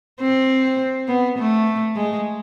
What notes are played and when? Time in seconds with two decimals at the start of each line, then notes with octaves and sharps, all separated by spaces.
0.20 C4
1.08 B3
1.38 A3
1.96 G#3